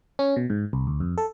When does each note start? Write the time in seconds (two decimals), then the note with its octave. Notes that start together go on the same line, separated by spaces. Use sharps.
0.19 C#4
0.36 B2
0.50 G#2
0.73 C2
0.87 D2
1.00 F2
1.18 A4